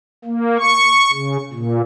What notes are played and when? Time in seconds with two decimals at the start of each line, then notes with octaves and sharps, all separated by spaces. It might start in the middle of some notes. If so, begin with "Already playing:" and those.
0.25 A#3
0.58 C#6
1.12 C#3
1.53 A#2